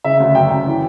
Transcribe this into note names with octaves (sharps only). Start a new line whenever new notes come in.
C#3 E5
D2
F#2 G5
F#2
E3